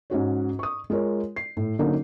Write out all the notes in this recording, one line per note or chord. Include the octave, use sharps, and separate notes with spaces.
G#2 C#4 F#4 C#5
C#6 D#6
G#3 F4 A#4 C#5
C7
A2
D3 F#3 A#3 C#4 D#4